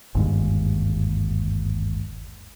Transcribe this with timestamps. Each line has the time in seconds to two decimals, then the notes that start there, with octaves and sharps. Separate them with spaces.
0.15 G1 D#2 G#2